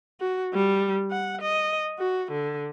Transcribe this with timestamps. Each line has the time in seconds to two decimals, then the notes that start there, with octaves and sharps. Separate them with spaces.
0.20 F#4
0.54 G3
1.11 F#5
1.42 D#5
1.99 F#4
2.32 D3